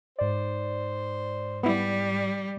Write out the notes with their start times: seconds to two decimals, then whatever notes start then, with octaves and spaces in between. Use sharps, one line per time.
0.19 G#2 C5 D5
1.63 G3 B3 E4